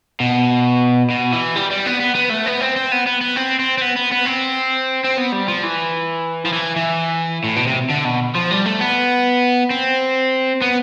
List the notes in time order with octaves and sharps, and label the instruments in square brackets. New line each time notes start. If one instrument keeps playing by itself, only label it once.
[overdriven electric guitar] B2
B2
E3
G3
G3
B3
B3
B3
A3
B3
C4
C4
B3
B3
B3
C4
C4
C4
B3
B3
B3
C4
C4
B3
G3
F3
E3
F3
E3
E3
A2
B2
C3
D3
B2
F3
G3
A3
B3
C4
B3